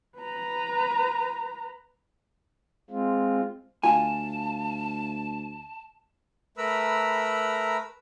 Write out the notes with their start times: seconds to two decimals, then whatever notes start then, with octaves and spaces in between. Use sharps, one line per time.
0.18 B4 A#5
2.90 G#3 C4 F4
3.83 D2 F4 G#5 A5
6.57 A3 A#4 B4 A#5 B5 E6